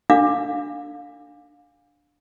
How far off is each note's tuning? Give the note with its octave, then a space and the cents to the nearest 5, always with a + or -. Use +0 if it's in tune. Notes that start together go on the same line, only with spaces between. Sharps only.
D4 +0 F5 +20 D6 +10